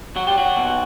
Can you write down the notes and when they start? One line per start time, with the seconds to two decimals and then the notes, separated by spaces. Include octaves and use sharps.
0.16 F#3 F#4
0.27 G4
0.38 F#4
0.57 B2